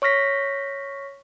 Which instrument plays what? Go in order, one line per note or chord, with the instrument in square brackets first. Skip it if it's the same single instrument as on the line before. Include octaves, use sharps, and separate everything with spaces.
[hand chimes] C#5 C#6 F6 A#6 B6